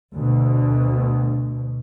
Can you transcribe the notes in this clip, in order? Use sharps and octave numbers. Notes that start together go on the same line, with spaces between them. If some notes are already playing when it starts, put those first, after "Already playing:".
D2 B2